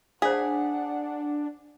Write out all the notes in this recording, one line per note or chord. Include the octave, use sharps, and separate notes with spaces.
D4 G#4 C5 F5 F#5